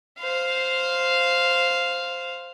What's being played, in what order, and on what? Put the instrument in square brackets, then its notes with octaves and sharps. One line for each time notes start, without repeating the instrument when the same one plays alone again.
[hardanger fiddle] C5 F5